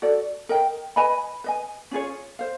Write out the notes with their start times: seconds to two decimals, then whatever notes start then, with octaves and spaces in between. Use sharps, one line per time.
0.02 F#4 A4 D5
0.49 A#4 D#5 G5
0.96 B4 D#5 G#5 B5
1.44 B4 D#5 G#5
1.91 C#4 F4 G#4 C#5
2.39 C5 F5